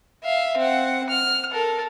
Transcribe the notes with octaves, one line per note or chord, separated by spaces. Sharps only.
E5 F5
C4 F#5
F6
A4 A#4